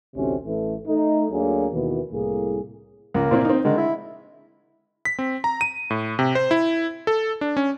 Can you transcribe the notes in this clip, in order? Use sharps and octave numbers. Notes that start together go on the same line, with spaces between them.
A1 D2 C3 C4 C#4
A1 E3 A3
A3 D#4
D2 D3 F#3 A#3 G#4
D#2 B2 E3
C2 A2 A#3 G#4
C#2 A#3
A#2 C4 E4
C4 D#4
D3 D#3 G#3
E4
B6
C4
A#5
D#7
A2
C3
C5
E4
A4
D4
C#4